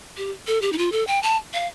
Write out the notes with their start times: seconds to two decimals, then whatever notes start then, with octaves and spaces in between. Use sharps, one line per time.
0.17 G4
0.47 A4
0.62 G4
0.72 D#4
0.78 F4
0.92 A4
1.07 G5
1.23 A5
1.53 F5